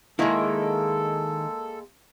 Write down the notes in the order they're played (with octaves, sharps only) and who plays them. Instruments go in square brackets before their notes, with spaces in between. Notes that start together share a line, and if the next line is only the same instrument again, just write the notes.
[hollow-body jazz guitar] D#3 E4 [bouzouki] G#3 A#3 [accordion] A4